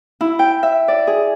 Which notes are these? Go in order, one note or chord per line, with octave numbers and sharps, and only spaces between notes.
E4
G5
E5
D5
G#4